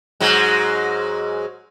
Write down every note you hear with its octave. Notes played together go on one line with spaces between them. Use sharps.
G#2 F#3 G#3